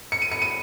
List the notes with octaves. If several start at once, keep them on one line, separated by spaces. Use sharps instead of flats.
C#7
D#7
C#7
D#7